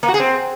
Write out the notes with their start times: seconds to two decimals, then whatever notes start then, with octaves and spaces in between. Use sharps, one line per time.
0.03 A#3
0.08 F#4
0.14 G#4
0.19 C4